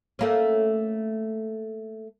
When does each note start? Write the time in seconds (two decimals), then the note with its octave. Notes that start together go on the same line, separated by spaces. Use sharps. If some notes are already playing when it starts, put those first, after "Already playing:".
0.19 A3 A#3 C#4